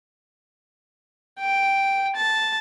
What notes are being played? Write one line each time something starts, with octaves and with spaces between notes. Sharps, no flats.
G5
A5